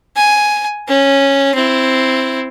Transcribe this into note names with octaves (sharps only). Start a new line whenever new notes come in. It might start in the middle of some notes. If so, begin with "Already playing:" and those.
G#5
C#4
C4 E4